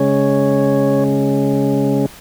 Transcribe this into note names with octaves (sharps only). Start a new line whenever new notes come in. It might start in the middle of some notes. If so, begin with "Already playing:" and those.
Already playing: C#3 G#3 C#4 C#5